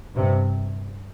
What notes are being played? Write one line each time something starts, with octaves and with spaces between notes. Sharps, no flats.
G2 C3